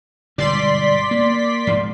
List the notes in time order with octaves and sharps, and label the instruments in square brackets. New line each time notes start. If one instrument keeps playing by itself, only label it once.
[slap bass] G1 G#2 B2 [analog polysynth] D5 C6 B6
[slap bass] A#3
G#2 F3